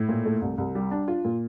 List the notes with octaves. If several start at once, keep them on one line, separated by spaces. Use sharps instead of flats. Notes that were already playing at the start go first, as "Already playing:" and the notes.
Already playing: A2
A#2
A3
C2
C2
G3
D4
F4
A#2